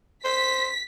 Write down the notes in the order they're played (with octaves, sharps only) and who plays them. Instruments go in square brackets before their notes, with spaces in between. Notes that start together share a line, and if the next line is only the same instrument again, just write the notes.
[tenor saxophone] C5 [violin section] B6